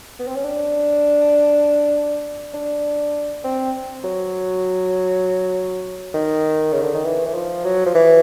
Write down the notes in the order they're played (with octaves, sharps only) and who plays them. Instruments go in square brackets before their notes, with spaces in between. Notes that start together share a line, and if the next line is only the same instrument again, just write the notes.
[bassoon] B3
C4
C#4
D4
D4
C4
F#3
D#3
C#3
D3
D#3
E3
E3
F3
F#3
F3
E3